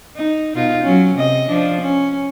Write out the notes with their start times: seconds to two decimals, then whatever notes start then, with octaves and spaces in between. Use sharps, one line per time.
0.16 D#4
0.55 B2 D#4 F4
0.83 F#3 C#4
1.15 C3 D#5
1.47 F3 D4
1.81 C#4